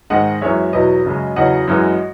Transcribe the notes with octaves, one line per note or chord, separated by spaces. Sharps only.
G#2 D#3 G#3 D#5 F#5
F#2 E3 G#3 C#5 E5
E2 B2 F#3 B4 D#5
F#2 C#3 G#3
E2 C#3 F#3 D#5 F#5
F#2 E3 G#3